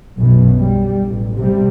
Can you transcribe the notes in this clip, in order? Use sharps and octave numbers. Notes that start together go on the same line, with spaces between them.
B1 F#2 B2
G3
A1
C3 G3